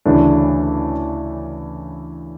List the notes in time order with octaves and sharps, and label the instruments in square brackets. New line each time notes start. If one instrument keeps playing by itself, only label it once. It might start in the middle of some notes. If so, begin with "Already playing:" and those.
[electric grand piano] D2 C#3 E3 A3 D4